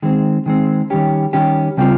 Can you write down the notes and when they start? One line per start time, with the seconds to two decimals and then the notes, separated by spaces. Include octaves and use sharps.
0.02 D#3 G#3 C4
0.46 D#3 G#3 C4
0.90 D#3 G3 C#4 G4
1.33 D#3 G3 C#4 G4
1.77 C#3 G3 C4 F4